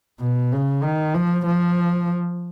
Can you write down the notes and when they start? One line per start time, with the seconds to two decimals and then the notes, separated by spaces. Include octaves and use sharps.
0.20 B2
0.52 C#3
0.83 D#3
1.14 F3
1.46 F3